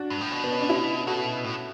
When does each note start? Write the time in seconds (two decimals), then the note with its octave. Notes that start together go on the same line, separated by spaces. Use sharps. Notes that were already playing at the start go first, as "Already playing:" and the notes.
Already playing: D4 F#4
0.10 G2
0.21 A2
0.32 B2
0.44 B3
0.52 C#4
0.61 D4
0.69 C#4 E4
1.07 B2 F#4 A4
1.44 A2